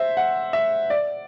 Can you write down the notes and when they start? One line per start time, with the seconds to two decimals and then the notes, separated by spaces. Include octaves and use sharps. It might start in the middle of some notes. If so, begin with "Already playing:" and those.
Already playing: C5 E5
0.17 F#5
0.53 E5
0.90 D5